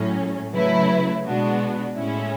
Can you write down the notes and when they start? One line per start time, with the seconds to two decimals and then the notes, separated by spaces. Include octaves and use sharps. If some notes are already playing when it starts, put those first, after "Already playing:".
Already playing: A2 F#3 C#4
0.53 C#3 F#3 A3 E4 B4
1.25 B2 G#3 B3 D4 F#4
1.97 A2 G#3 C#4 E4